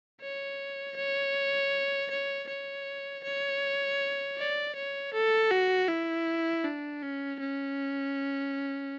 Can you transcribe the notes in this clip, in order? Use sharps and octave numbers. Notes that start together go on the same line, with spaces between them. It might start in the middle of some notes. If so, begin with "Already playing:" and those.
C#5
C#5
C#5
C#5
C#5
D5
C#5
A4
F#4
E4
D4
C#4
C#4